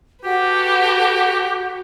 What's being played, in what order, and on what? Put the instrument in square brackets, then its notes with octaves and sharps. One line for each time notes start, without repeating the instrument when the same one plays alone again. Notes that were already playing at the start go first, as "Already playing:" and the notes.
[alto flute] F#4 [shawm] G4 [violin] A4 B4